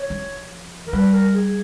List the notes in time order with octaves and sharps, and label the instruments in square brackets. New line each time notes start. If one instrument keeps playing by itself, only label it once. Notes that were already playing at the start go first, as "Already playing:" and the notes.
Already playing: [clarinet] C#5
[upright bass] F3
[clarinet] A#4
[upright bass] G3 [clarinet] B4
[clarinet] A#4
G#4